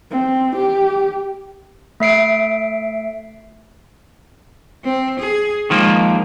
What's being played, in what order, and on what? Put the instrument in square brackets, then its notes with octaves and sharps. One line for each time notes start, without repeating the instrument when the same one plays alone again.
[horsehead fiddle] C4
G4
[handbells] A3 E5 C7 D7
[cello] C4
G#4
[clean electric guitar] D#3 F3 A#3 [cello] G#3